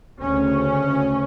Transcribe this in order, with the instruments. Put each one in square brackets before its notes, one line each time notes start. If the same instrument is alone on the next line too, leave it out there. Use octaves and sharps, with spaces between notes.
[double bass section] D2 C#3 C#4